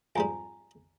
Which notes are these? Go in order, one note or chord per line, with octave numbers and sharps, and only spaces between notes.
F2 G#2 G3 G#5 A#5